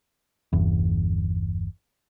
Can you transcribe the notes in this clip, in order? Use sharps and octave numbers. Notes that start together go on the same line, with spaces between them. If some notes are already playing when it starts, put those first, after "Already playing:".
G1 E2